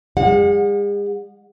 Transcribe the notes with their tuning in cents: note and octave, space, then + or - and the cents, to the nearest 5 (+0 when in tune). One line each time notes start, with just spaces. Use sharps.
G#3 -45 F#5 -30